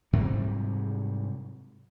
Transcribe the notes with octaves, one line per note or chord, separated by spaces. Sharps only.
G#2 C3 F#3 G3